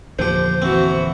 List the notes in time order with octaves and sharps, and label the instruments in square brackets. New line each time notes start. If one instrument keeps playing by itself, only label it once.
[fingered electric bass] E2 A#2 D3 [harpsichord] F3 G4 [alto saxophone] C5
[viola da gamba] E3 F#4 [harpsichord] C4